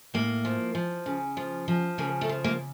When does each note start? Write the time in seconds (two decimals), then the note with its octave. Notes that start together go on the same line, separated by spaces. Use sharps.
0.14 A2 A#3
0.45 F3
0.75 F3
1.06 C#3
1.37 F3
1.68 F3
1.98 C#3 A#3
2.21 A3
2.29 F3
2.44 A#3